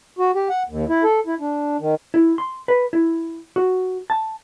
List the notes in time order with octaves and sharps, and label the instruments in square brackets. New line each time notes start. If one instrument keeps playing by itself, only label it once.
[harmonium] F#4
G4
F#5
D#2
E4
A4
E4
D4
D#3
[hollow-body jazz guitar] E4
C6
B4
E4
F#4
A5